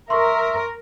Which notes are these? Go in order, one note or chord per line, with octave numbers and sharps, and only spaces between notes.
A#4 E5 C6 C#6